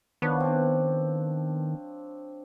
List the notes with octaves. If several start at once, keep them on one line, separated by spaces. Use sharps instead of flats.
D#3 F3 B3 D4 C#5
C4 D4